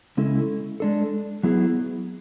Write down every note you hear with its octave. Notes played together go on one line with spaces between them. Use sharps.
C#3 G#3 C#4 E4 A4
G#3 D4 A4
F#3 B3 E4 G#4